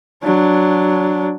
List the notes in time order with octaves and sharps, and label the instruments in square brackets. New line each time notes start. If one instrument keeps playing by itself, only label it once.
[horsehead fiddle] F#3 D4